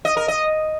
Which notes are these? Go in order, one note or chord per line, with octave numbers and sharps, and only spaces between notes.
D#5
A#4
D#5